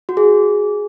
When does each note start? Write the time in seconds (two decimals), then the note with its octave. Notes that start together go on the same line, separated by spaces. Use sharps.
0.09 F#4
0.17 G#4